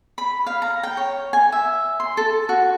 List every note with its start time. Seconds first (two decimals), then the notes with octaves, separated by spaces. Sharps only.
0.18 B5
0.46 F5
0.62 A#5
0.83 G5
0.97 C#5
1.33 G#5
1.52 E5
2.00 C6
2.17 A4
2.49 F#4